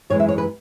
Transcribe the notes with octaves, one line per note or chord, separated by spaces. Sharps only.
F#2 E3 G#3 C#5
E5
C#5
B4